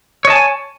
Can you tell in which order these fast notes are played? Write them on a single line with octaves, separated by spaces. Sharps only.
C#5 D#5 A5 G#5